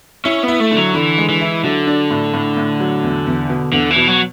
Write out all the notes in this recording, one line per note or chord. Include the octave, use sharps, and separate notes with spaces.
C#4 E4
B3
E4
A3
D3
F#3
D3 E3
G#3
E3
E4
D3 F#3
D4
A2
A2
A2
F#3
E2
E2
B2
E2 D3
E3
B2
F#3